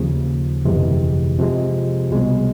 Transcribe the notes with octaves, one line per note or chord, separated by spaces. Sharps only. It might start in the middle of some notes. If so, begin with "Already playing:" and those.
Already playing: D#2 C#3 F3
G1 F2 C3 E3 G#3
C3 F3 G#3
C2 B2 G#3